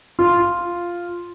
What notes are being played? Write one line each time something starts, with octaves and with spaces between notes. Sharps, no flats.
F4